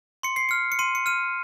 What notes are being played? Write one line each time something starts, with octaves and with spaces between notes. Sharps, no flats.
C6 C#7
C7
F6 C#7
C#7
C6 D#7
C#7
F6 D#7